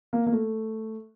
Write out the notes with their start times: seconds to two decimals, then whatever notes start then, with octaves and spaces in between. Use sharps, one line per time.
0.13 A#3
0.26 A#3
0.32 A3